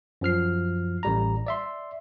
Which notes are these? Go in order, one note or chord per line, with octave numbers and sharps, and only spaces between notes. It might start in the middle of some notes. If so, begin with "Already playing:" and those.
F#2 F3 F6 C7
A1 G3 A#5
D5 E5 C6